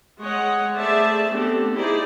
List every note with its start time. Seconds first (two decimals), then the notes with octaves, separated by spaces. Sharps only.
0.21 G#3 C#5 D#5 F#5
0.74 A3 G#4 C5 D5 E5 A5
1.28 A3 B3 C4 D4 G4 A4
1.74 D#4 E4 G4 G#4 C5 D5